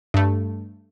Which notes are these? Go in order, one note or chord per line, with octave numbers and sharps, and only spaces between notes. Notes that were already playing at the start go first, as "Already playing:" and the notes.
G2 A3